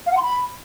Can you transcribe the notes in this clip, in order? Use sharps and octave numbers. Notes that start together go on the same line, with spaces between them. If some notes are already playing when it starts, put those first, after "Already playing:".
F5
F#5
C6
B5